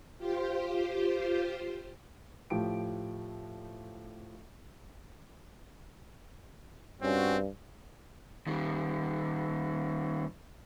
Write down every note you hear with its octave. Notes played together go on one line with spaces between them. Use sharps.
F4 G4 C5
A2 F3 G4 D7
G2 C4 C#4 F#4
D#3 G3